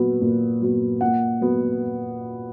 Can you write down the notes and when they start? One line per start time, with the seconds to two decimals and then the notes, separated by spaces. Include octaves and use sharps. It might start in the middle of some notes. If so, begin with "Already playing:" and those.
Already playing: A#2 F#3 B3
0.21 A#2
0.61 F#3 B3
1.01 A#2 F#5
1.41 F#3 B3